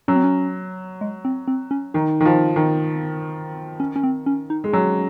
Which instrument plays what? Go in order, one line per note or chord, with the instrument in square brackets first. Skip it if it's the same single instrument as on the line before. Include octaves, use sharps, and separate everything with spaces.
[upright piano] F#3 [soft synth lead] C#4
[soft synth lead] C4
C#4
G#3
C4
C4
C#4
[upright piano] D#3 [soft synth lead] D#4
[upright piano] D#3
F3
D#3
[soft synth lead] C#4
C#4
C4
C#4
D#4
[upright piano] G#3
[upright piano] F#3 [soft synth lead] C#4